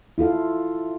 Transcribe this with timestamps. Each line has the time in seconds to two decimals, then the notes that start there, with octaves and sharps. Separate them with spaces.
0.18 E4 F4 A4 F5